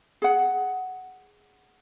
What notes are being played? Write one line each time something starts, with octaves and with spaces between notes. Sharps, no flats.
G#4 F#5